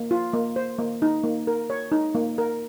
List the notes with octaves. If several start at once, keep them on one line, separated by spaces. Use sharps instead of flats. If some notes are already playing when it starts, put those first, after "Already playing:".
Already playing: A#3
F4
A#3
C5
A#3
D#4
A#3
A#4
C#5
D#4
A#3
A#4